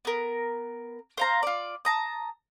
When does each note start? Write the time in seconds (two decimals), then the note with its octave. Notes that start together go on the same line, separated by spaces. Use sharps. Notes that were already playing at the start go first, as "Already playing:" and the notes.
0.05 B3 A#4
1.18 C5 F5 A#5
1.43 F4 D5
1.85 A5 A#5 D#6